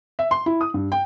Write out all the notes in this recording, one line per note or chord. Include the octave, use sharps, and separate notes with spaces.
E5
C6
E4
D#6
G2
G5